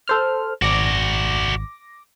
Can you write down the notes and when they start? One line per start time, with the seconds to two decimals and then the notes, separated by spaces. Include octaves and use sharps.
0.08 A4 C5 F6
0.62 G#1 F#4 D5 D6 A#6